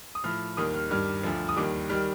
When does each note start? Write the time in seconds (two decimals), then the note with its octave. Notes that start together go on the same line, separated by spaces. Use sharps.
0.15 D#6
0.24 A2 F3 F6
0.57 D#2 D#3 G3 D#6
0.74 F6
0.90 G2 D#3 G3 F6
1.23 D2 D3 F3
1.49 D#6
1.56 D#2 D#3 G3 D6
1.89 D#3 G3 F6